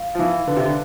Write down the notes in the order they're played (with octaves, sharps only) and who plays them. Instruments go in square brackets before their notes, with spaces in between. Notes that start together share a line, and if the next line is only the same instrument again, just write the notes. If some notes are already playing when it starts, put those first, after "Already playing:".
Already playing: [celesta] F5
[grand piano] F3
[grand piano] E3 [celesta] F5
[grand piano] D3 [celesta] B4
[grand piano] C3
D3